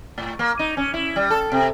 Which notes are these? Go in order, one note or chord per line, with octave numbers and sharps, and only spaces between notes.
A2
A#3
D#4
C#4
E4
G3
A4
C3